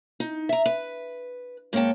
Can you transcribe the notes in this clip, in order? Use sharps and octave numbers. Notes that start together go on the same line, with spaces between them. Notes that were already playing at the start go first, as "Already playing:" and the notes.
D#4
E5 A#5
B4
G#2 A#3 C#5 G5 A5